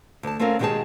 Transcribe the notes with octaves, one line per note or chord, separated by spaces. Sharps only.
D2 A5
A3 C4 C#4 F4 A#4
B2 D#3 G#3 G4 G#4 A5